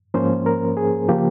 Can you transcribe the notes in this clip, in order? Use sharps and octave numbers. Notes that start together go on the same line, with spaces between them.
G#2 F3 A#3 C#4 C5
A#4
G#4
C#3 F3 A#3 G4